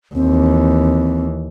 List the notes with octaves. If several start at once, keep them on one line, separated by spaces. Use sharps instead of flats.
D#2 E3 C4